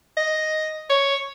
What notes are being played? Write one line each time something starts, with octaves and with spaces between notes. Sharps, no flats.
D#5
C#5